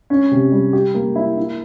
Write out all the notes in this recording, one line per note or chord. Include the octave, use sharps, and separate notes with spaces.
C#4
C3
G3
G4
A#3
E4
E4